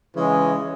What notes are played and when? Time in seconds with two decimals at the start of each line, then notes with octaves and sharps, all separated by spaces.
0.16 C#3 E3 G#3